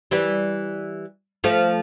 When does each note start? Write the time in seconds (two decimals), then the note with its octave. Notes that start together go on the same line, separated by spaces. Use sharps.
0.11 E3 G3
1.44 F3 A3